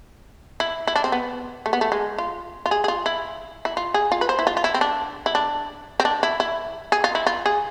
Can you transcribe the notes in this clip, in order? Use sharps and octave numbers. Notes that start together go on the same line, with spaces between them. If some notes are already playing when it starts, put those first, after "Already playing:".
E4
E4
D4
C4
B3
A3
B3
A3
G#3
F4
F4
G#4
G#4
F4
E4
E4
F4
G#4
F4
B4
C5
E4
F4
F4
E4
C4
D4
E4
D4
C4
D4
E4
E4
G#4
F4
E4
F4
G#4